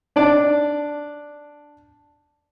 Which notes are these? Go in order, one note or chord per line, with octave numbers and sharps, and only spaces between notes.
D4 D5